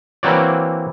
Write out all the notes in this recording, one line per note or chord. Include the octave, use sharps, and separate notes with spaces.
E3 A#3 C4 F#4 C#5 D5